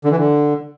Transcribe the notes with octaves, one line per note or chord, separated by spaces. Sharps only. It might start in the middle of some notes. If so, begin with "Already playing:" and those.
D3
E3
D3